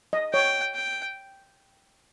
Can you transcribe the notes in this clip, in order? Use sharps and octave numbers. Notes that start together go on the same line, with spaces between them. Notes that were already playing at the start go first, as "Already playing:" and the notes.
D#5
C#5 G5
G5